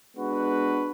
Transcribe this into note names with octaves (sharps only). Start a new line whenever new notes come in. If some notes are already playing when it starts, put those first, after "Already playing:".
G#3 B3 D4 F#4 B4